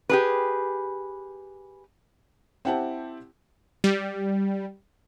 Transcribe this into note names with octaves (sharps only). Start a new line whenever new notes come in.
G4 G#4 B4
C4 E4 G4 F#5 G5 A5
G3